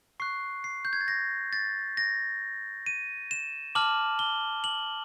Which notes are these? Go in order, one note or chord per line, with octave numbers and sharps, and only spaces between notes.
C#6 F#6 C7
C7
G6
G#6
A6
A#6
A6
A#6
D#7
E7
A5 D6 F6 F#7
G7
F#7